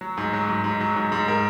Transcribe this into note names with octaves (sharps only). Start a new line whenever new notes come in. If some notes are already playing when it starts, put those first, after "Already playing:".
F#3
G#2
F#3
G#2
G#2
F#3
G#2
G#2
A#4